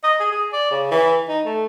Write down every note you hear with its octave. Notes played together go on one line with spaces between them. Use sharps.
D#5
G#4
G#4
D5
C#3
E3
D#4
A3